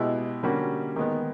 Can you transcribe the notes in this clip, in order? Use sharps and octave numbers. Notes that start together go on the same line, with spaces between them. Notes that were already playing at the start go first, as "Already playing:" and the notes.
Already playing: B2 G#3 B3 E4 G4
D3 G3 A#3 C#4 F#4
D#3 G#3 B3